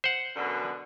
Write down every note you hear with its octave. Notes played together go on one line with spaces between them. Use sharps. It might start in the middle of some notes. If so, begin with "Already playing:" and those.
C5 F#5
F#2 B2 D3